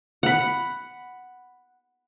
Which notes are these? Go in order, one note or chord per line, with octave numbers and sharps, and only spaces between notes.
F#5 B5